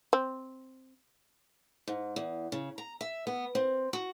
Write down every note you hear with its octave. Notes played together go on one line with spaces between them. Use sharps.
C4
G#2
E2
C#3
A#5
E5
B3
C4
F#4